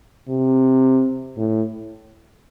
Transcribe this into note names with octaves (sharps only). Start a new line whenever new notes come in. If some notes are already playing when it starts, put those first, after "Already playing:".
C3
A2